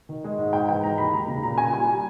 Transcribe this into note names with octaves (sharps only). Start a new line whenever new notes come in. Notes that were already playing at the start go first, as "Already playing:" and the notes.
D#3
G#3
G#2
G#2 G5
E3 G5
G#3 A#5
D#2 B5
D#2 A#5
C#3
A#2 A#5
A#2 G#5
G3 G#5
G3